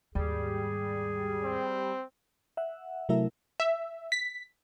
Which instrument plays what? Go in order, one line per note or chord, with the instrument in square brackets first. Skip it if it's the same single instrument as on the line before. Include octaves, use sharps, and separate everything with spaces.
[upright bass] D#2 G#2 [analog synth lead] G3 [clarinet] G#4
[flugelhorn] C4
[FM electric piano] E5 F#5
C3 F#3 A3 E4 A#4 E5
[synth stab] E5
B6